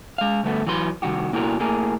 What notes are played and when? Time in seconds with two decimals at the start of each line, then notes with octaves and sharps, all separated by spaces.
0.18 G#3 F5
0.43 D2 G2 A3 B3
0.67 E3 F#3 B4 B5 C6
1.02 C2 D#3 F#4 G4
1.32 B2 A#3 E4 F#4 G4 A#4
1.60 A2 A#3 G#4 A#4